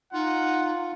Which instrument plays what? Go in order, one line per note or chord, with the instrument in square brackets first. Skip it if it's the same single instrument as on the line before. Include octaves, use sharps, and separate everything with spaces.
[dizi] D#4 [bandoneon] F4 [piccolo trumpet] F#5